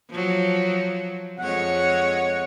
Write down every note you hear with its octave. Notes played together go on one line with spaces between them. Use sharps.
F3 F#3
F2 G#3 C#5 F#5